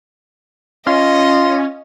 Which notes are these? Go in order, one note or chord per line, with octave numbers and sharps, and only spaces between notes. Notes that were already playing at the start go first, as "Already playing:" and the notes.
C#4 F4 D#5